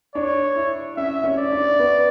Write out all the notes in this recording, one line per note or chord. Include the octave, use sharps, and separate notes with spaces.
D4 C#5
E4
C#4 E5
C#4
D5
D4
B3